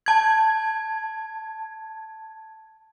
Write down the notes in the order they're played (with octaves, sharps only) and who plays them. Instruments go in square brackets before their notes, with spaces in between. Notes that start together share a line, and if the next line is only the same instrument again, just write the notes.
[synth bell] A5 G#6